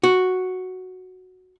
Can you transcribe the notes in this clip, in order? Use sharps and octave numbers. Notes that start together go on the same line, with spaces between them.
F#4